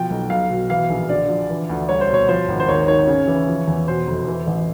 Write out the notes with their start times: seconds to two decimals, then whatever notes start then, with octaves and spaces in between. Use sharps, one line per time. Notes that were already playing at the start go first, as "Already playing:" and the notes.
Already playing: B2 F3 G5
0.10 B1
0.30 B1 F5
0.50 B2
0.70 E3 F5
0.90 A#1
1.09 D3 D5
1.30 F3
1.49 E3
1.70 D2
1.89 C2 C#5
2.01 C5
2.09 B2
2.14 C#5
2.29 F3 C5
2.48 G#1
2.60 C5
2.68 D#2 C#5
2.88 D#3 C#5
3.08 C#3
3.28 E3
3.48 F3
3.67 E2
3.87 B2 C5
4.07 F1
4.27 E3
4.47 A1